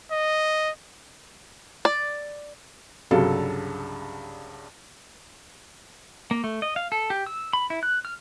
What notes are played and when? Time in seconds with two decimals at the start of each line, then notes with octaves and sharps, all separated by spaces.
0.11 D#5
1.85 D5
3.11 C2 G2 C#3 F#3 A4 F5
6.31 A#3
6.44 A3
6.62 D#5
6.76 F5
6.92 A4
7.10 G4
7.26 E6
7.53 B5
7.70 E4
7.83 F#6
8.05 F6